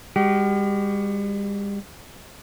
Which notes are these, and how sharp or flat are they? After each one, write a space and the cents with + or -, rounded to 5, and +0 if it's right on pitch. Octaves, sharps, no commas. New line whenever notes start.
G3 +45 G4 -40